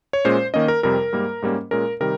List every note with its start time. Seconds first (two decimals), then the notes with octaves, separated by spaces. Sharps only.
0.13 C#5
0.25 A#2 G#3 C#4 C5
0.54 D#3 A#3 C#4 D#5
0.68 A#4
0.83 F2 C3 G3 A#4
1.13 G#2 G3 A#3
1.42 G#2 G3 A#3 C#4
1.71 A#2 G#3 C#4 A#4
2.00 C3 D#3 G3 A#4